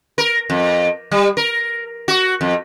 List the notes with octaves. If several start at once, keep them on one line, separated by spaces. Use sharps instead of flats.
A#4
F2
G3
A#4
F#4
F2